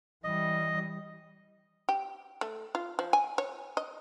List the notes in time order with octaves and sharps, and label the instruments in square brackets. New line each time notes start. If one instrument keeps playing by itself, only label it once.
[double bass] E3 G3 [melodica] D#5
[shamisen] G4
A3
F4
F3
G#5
C#5
D#5